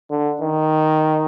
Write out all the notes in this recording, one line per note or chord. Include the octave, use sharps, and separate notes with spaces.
D3
D#3